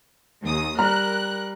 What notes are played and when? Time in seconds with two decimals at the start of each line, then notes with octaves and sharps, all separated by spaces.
0.42 D#2 D#6
0.79 G3 A#4 A#5 F6 F#6